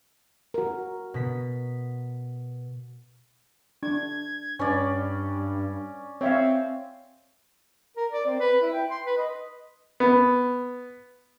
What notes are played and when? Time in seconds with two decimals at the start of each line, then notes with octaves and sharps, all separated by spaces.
0.54 F#4 A#4
1.14 B2 B6
3.83 D4 G#6
4.59 G2 C#4 D5
6.21 C4 C#5 E5 F5
7.97 A#4
8.11 D5
8.26 C4
8.40 B4
8.62 E4
8.73 G5
8.90 C6
9.06 B4
9.18 D#5
10.00 B3